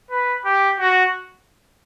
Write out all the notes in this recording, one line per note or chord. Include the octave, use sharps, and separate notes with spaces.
B4
G4
F#4